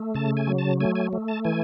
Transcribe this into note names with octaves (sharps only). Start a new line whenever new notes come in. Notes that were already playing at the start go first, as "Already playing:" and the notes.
Already playing: A3
C#3 A5
G#5
F#3
A5
A3 G#5
G#5
A3
A5
E3 G#5